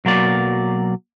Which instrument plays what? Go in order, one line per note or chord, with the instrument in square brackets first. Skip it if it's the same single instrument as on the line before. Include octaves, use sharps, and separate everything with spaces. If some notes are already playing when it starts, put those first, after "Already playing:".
[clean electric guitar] B1 F#3 A#3 D5